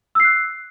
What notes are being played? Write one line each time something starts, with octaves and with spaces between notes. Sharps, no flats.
E6 F#6 C7